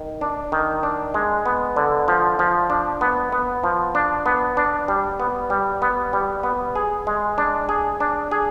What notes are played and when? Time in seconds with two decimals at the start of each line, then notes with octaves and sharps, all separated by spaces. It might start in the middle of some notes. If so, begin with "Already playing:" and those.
Already playing: D#3
0.21 D4
0.52 D#3
0.83 D4
1.14 G#3
1.46 B3
1.76 D3
2.08 F3
2.39 F3
2.70 D4
3.01 B3
3.32 B3
3.64 F3
3.95 D4
4.26 B3
4.57 D4
4.88 G3
5.20 B3
5.50 G3
5.82 B3
6.13 G3
6.43 B3
6.75 G#4
7.07 G#3
7.38 D4
7.69 G#4
8.00 D4
8.31 G#4